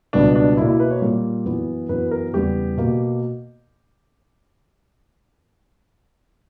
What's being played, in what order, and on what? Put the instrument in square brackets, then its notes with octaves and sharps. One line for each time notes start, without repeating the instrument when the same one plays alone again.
[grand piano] C#2 B2 G3 B3 D4
D4
B2 A#3 E4
E4
B4
C#5
A#2 G3 A#3
F#2 E3 B3
F#2 E3 B3 B4
A#4
E2 C#3 G3 B3 G4
B2 A#3